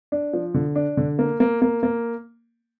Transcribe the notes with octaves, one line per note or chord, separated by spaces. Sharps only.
D4
F3
D3
D4
D3
A#3
A#3
A#3
A#3